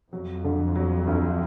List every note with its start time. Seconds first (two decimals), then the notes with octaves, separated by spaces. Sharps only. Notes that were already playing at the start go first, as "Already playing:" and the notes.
0.13 F2 F#3
0.44 D3
0.76 F#3
1.07 D2